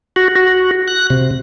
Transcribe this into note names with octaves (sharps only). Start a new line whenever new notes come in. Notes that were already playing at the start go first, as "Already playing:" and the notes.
F#4
F#4
F#6
C3